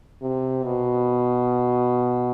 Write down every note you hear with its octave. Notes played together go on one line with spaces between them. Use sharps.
C3
B2